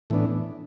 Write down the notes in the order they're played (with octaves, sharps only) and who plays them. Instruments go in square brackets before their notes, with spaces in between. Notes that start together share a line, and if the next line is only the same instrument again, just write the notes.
[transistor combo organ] A2 E3 B3 D4